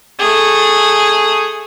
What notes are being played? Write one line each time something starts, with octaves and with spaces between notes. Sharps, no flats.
A3 G#4